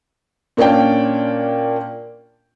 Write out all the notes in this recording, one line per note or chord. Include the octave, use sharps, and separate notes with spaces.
A#2 A#3 C#4 D4 G5